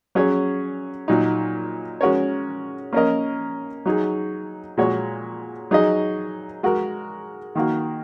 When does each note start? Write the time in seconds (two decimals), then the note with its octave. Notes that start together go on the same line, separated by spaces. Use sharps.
0.15 F#3 C#4 G#4 C#5
1.08 A#2 F#3 D#4
2.01 G#3 C#4 F#4 A#4 C#5
2.93 A#3 C#4 A#4 D#5
3.86 F#3 D#4 G#4
4.77 A#2 G#3 F#4 C#5
5.71 F#3 D#4 G#4 D#5
6.63 G#3 F#4 A#4
7.55 D#3 A#3 F#4